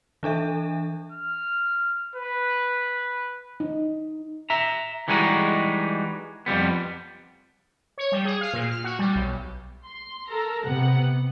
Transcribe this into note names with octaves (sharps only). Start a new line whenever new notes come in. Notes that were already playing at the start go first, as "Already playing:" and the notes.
E3 D4 A4 E5
F6
B4
D#4
E5 A#5
E3 G3 G#3 D#4 F#4
F2 F3 G3 B3
C#5
G3
G#4
F5
A#2
F6
F#4
G3
B1
C6
A4 A#4 A#5
C3 B3 F#5